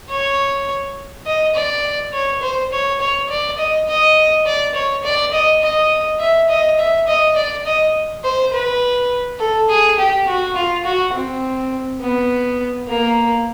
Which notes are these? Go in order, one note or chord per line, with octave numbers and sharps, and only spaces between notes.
C#5
D#5
D5
C#5
C5
C#5
C#5
D5
D#5
D#5
D5
C#5
D5
D#5
D#5
E5
D#5
E5
D#5
D5
D#5
C5
B4
A4
G#4
G4
F#4
F4
F#4
C4
B3
A#3